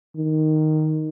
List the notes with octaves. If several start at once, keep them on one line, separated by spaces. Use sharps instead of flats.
D#3